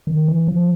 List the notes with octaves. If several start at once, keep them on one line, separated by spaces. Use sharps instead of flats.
D#3
E3
F3